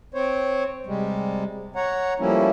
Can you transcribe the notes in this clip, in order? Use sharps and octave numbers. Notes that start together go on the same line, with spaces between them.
C4 C5 C#5
C3 G3 G#3
C#5 F#5 A#5
F3 G3 A3 A#3 C#4 E4